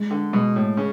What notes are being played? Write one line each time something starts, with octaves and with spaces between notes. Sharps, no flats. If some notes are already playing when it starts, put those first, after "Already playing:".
Already playing: G#3
D3
B2 G#3
A2
C#3